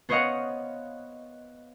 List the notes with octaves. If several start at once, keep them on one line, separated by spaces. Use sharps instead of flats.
B3 C5 C#5 D#5 F5 F#5